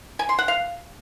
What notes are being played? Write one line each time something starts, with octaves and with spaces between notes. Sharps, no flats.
G#5
C6
F#5
F5